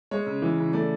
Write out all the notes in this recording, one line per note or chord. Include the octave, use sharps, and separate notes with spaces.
G#3 C#5
C#3
E3
C#3
A3 D5